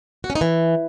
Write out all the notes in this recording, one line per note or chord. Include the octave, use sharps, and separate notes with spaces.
F#4
C#4
D#4
E3